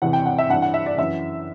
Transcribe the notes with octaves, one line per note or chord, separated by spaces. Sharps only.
E2 C3 E3 F#5
G5
F#5
E5
G2 E3 F#5
F#5
E5
D5
F#2 E3 E5